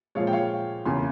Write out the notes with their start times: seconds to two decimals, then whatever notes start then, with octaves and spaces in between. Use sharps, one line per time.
0.15 A#2 F3 G#3 C#5 F5
0.27 G5
0.33 C#5 F5
0.85 E2 C#3 E3 A#3 C#4 G#5 C6